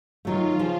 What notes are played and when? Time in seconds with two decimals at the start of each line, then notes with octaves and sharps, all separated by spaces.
0.25 D#3 F#3 A3 F4
0.59 C#3 F3